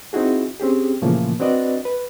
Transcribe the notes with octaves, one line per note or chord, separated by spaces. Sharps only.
C4 D#4 E4 F#4 G#4
C4 C#4 G4 G#4
A#2 C#3 E3 F3 A3 A#3
C4 D4 F#4 B4 D5 D#5
B4